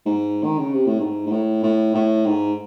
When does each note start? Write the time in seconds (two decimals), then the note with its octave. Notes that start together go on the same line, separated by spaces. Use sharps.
0.06 G#2
0.44 D#3
0.58 C#3
0.73 C3
0.86 A2
1.00 G#2
1.26 G#2
1.31 A2
1.63 A2
1.95 A2
2.26 G#2